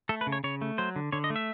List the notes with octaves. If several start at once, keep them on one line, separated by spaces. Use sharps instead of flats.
A3 A4
B4
C#3
C#5
C#3 C#5
A3
F#3 C5
D3
D3 C#5
D#5
A3
E5